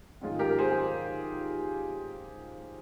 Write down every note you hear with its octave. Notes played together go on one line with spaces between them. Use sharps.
G#2 D#3 G#3 C#4 F4
G4 A#4
G#4 C5